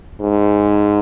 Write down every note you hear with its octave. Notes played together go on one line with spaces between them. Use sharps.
G#2